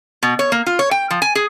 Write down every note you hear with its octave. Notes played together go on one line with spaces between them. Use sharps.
B2
C#5
A#3
F4
C#5
G5
F3
G#5
G#4